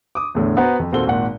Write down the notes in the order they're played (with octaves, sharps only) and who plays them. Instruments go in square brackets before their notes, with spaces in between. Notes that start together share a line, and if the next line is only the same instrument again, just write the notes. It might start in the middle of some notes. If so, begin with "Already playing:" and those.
[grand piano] D6 D#6
E2 A2 D3
B3 F#4 B4 C5 F#5 A#5
F2
D#2 A#2 C4 F#4 A4 G7
G#1 A#2 F#5